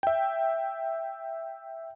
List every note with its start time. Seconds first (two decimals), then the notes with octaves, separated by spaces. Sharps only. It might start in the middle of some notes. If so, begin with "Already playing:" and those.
0.03 E5 G5